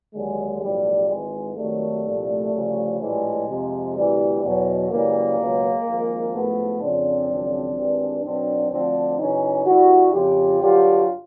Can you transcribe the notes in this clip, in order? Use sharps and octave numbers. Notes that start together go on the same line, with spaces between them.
D#2 D3 F#3 G#3
B1 A2 F3 G3
G#1 G#2 E3 G#3
G#1 F#2 D#3 F#3 G3 A3
C2 A#2 F3
D2 C#3 F3
A#1 A2 E3 G3 G#3
F2 C3 F3
D2 C3 E3 G3
E2 B2 F#3
F#2 C#3 E3 G3 G#3 A#3
C#2 B2 F#3
G#1 G#2 F3
A1 G#2 F3 A3 B3
F2 C#3 F3 C4 D4
G#1 F#2 C#3 F3
G#1 G2 E3
B1 B2 F#3 C4 D4
D2 D3 F3 C4 D4
F#2 C#3 E3 C#4 D#4
G2 D3 G3 E4 F#4
F2 C#3 F3 F4 G4
G2 D3 F#3 F4 G4